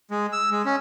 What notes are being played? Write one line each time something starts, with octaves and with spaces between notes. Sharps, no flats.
G#3
E6
G#3
C#4